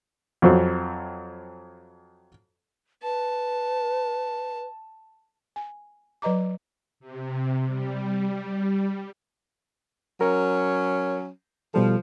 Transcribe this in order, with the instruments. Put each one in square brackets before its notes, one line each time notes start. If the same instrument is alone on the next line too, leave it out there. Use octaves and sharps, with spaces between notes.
[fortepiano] F2 F#3 C4
[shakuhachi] B4 [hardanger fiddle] A5
[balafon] G#5
F#3 B4 D#5 A#5 D6
[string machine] C3
G3
[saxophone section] F#3 C#4 [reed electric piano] A#4
[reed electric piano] B2 G3 A4 [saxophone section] F3